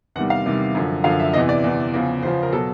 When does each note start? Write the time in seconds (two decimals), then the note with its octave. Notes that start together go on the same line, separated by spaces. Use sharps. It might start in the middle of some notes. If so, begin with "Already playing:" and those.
0.16 E2 C3 D#3 G3 F#5
0.30 F5
0.45 E2 C3 D#3 G3
0.75 F#2 D3 F3
1.04 F#2 D3 F3 F5
1.20 E5
1.34 E2 C3 E3 D#5
1.49 D5
1.64 E2 C3 E3
1.94 E2 C#3 F3
2.22 E2 C#3 F3 C5
2.43 A#4
2.52 B2 F#3 A4